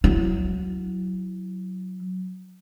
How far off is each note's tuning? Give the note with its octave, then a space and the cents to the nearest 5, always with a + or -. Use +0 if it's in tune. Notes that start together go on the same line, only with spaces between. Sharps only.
F#3 +0 E4 +0